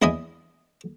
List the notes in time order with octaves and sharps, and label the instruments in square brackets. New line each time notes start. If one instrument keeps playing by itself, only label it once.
[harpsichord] E2 E4 D#5 E5 G#5